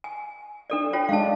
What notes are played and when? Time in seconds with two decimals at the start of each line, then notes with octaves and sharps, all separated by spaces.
0.04 G#5
0.70 D4 A4 D5
0.93 F4 C#5 G5
1.09 G#3 D4 F5 A5